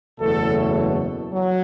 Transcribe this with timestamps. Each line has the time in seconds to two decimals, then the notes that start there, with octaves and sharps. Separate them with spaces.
0.19 F#1 E2 B2 F#3 A3 A4
1.33 F#3